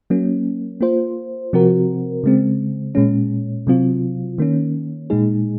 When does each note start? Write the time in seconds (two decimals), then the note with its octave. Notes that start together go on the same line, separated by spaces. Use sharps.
0.10 F#3 A#3 C#4
0.81 A#3 F4 C5
1.53 C3 F3 C4 F#4 A#4
2.24 C#3 G#3 C4
2.95 A#2 G#3 C#4
3.67 C3 F#3 C4 F4
4.38 D#3 A#3 C#4
5.10 A#2 G#3 D#4 G#4